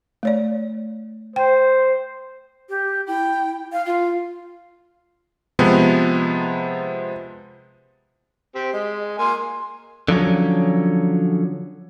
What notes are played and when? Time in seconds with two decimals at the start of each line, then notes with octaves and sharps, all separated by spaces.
0.23 A3 C#5 D5
1.36 C5 G5
2.69 G4
3.07 E4 G5
3.73 F5
3.86 F4 F5
5.59 C3 F3 G#3 B3
8.55 C4 G4
8.73 G#3 D#5
9.18 A#3 G#5 C6
10.08 D3 F3 F#3 C#4